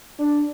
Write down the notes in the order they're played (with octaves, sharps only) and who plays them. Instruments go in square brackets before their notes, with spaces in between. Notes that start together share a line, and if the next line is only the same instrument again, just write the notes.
[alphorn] D4